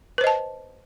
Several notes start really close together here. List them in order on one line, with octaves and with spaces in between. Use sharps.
B4 C5 D#5 A5